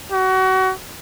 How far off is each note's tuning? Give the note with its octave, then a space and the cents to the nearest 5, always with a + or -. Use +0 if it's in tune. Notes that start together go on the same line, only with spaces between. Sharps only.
F#4 +30